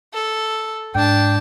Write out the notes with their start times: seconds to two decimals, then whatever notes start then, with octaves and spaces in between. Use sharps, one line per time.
0.14 A4
0.95 G#2 D4 G5 A5